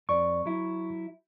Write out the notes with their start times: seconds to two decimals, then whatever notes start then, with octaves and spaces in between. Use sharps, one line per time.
0.09 F2 D5 C#6
0.46 F#3 E4